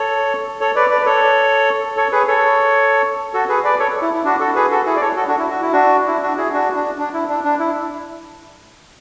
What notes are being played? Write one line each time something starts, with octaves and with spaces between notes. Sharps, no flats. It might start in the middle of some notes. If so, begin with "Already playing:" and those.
Already playing: A4 C#5
A4 C#5
B4 D5
B4 D5
B4
A4 C#5
A4 C#5
G#4 B4
A4 C#5
F#4 A4
G#4 B4
B4 D5
A4 C#5
E4
E4
D4 F#4
F#4 A4
G#4 B4
F#4 A4
E4 G#4
D5
A4 C#5
F#4 A4
D4 F#4
E4
F#4
E4
D4 F#4
E4
D4 F#4
E4 G#4
D4 F#4
D4
D4
E4
D4
D4
E4